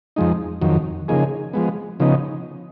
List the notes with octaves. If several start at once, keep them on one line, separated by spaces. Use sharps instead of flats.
F2 F3 G#3 D#4
F2 D#3 F#3
C#3 F3 A#3 D#4 G#4
F3 G#3 B3
C#3 F3 B3 D#4